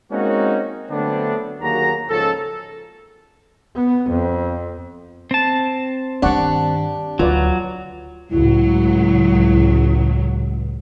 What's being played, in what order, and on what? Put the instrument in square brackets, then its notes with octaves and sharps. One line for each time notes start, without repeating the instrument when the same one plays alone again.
[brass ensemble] G#3 A#3 C4 C#4 D#4 F#4
D3 F#3 A3 B3 C4 D4
D#2 F#3 A#3 F#4 G#4 A#5
C#2 G#2 F3 C#4 A4
[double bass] B3
F2
[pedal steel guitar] C4 A5
[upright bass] G2 D#3 [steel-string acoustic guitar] D4 G4 [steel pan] D5 F#5 C#6
[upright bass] D2 [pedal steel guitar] F#3 [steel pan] F4 B4 D5
[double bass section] C#2 A2 [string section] F#3 [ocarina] E4